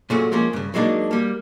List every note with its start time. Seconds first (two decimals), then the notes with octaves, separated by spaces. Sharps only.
0.10 A#2 F#3 A3 C#4 F#4 G#4
0.32 F3 G#3 A#3 C#4
0.53 G2 C#3
0.74 F#3 G#3 A#3 D4 D#4
1.11 G3 A#3